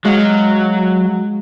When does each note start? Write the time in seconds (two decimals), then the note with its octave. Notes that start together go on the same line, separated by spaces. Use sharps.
0.05 F#3 G#3 F5